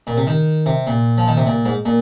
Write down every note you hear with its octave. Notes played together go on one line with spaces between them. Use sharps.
A#2
C3
D#3
C3
A#2
F3
D#3
C3
A#2
G#2
A#2